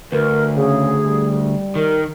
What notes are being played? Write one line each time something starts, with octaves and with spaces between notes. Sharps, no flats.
D2 A#4 B4
C#3 G#4
G3
D#3 A#4